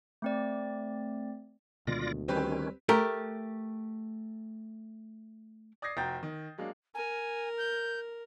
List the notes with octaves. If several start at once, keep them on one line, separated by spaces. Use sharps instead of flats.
A3 C4 D5
D2 B2 D#3 G#3 F4 D5 A#6
D#3 G3 C4 C#4 G4 B4
A3 G4 A#4
D5 D#6 G#6 A#6 C7
F1 F#4 G5 A#5 G6 A6
D#3
F#3 G#3 A#3 D4
A#4 G#5
G6